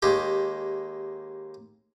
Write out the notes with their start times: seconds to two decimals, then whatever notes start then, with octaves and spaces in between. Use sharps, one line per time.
0.02 D#2 G#3 G4